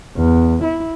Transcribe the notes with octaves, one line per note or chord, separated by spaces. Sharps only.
E2
E4